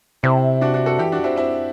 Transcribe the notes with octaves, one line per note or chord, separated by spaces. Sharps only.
C3 C4 E4
D4 F#4
D4 F#4
F#4 A4
E3 E4 G4
D4 F#4
C4 E4
C4 E4